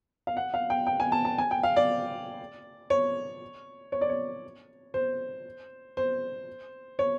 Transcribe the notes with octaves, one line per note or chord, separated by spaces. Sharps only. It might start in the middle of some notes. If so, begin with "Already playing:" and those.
F5
F#5
F5
G5
G5
G#5
A5
A5
G#5
G5
F5
D5
C#5
C#5
D5
C#5
C5
C5
C#5